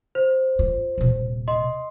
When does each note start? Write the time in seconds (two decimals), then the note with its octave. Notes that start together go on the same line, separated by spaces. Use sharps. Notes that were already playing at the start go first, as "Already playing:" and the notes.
0.15 C5
0.59 F4
0.98 D#1 C3
1.48 D#5 C6